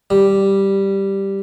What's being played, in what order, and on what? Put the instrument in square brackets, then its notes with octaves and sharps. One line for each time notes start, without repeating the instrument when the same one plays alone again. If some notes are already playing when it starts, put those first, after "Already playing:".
[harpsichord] G3